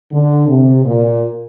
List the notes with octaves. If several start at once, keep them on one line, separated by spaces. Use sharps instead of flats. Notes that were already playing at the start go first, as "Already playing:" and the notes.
D3
C3
A#2